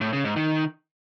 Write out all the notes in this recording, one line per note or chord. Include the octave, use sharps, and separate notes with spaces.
A2
C#3
G#2
D#3